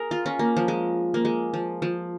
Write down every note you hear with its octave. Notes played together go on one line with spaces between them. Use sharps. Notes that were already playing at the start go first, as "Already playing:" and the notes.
Already playing: G#4 A#4
F4
C#4
A#3
F3
G#3
A#3
G#3
F3
F3